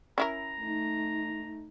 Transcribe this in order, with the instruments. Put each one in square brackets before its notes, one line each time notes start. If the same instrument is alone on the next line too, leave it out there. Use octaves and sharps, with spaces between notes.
[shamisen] C#4 E4 A#4 [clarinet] A#5
[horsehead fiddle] A3 D#4